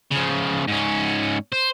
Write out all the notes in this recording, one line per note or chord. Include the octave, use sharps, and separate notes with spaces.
C#3 F3
G#2 C#4
C5